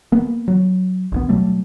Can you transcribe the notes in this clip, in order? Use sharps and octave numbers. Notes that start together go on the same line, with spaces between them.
A#3 B3
F#3
A#1 D#2 B3
B2 F#3 G3 A3